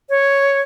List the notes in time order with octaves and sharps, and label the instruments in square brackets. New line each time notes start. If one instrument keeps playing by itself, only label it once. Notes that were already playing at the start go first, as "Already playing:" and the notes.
[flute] C#5